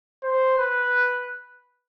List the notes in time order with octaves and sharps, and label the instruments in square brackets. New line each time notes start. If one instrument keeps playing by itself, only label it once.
[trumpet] C5
B4